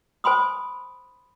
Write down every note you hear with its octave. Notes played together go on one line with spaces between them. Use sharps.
C5 G#5 B5 C6 D#6